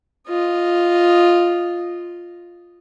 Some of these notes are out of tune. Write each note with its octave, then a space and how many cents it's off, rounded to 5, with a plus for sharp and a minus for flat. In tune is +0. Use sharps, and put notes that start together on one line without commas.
F4 +0 D#5 -5